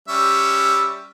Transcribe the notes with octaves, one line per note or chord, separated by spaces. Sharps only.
G3 C#4 E5